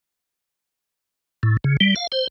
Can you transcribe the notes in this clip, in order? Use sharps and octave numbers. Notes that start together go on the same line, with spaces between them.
A2
C#3
G3
F5
C5